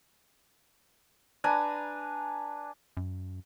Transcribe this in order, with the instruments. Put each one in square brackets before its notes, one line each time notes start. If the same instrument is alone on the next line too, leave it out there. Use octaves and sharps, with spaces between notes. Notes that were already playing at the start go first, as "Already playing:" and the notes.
[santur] D4 B4 G#5 A#5
[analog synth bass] F#2